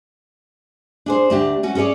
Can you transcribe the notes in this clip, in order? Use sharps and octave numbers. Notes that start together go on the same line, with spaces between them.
D4 G#4 C5
D2 D4 G4
C#4 F#4
C#4 G#4 A#4 C#5 D5